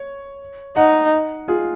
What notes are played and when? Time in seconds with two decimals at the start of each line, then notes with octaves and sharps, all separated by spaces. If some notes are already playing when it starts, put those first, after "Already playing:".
Already playing: C#5
0.76 D#4 D#5 F#5
1.48 F4 G#4